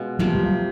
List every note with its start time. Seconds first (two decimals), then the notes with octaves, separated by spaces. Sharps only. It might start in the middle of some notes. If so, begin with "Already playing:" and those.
Already playing: B2 G#3 C#4 F4
0.19 C3 F3 F#3 A#3
0.35 G3
0.46 F#3